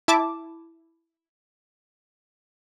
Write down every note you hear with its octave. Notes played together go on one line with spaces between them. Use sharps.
E4 A5 D6